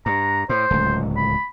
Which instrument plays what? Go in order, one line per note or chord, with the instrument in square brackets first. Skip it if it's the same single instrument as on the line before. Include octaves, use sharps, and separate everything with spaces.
[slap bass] G2 [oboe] A#5
[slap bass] A2 [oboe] C5
[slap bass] D1 C#2
[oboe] B5